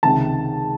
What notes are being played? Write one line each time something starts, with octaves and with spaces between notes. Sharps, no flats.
C#2 C3 D#3 A5